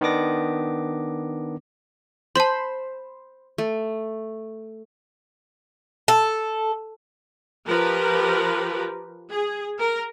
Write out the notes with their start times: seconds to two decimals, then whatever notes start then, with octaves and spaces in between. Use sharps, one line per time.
0.01 D#3 B3 D4 D6 A#6
2.36 C5 A5 B5 C6
3.58 A3
6.08 A4
7.67 F3 G4 A#4 B4
9.31 G#4
9.80 A#4